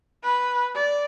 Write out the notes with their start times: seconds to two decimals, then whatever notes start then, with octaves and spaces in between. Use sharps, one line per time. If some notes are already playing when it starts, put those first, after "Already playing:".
0.24 B4
0.75 D5